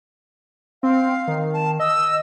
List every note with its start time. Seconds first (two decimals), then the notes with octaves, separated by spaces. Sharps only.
0.83 C4 F5
1.28 D#3
1.54 A5
1.80 D#5 E6